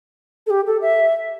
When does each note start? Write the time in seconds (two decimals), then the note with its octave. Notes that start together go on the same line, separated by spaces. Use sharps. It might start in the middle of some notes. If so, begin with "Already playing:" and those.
0.47 A4
0.50 G4
0.66 A4
0.82 E5